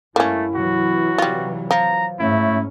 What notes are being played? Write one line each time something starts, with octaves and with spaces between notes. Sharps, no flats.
G2 A3 A#3 C#4 E4
C3 E3 F#3 F#4
G3 F4
F3 A#5
G#2 A3 C#4 E4